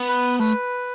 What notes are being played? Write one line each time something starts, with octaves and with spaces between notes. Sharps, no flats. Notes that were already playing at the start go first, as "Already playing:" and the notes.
Already playing: B3
B4
A3 B4